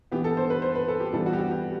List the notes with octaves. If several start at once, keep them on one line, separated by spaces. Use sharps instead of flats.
E3 B3 G4
A4
C5
B4
C5
B4
A4
G4
E3 G3 B3 A4
F#4
G4
F#4
G4